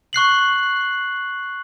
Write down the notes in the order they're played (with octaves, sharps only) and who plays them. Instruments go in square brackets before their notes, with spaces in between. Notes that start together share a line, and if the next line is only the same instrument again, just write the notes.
[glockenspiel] C#6 F#6 C7 F#7